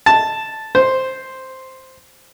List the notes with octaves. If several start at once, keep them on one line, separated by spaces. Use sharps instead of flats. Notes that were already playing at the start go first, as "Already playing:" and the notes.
A5
C5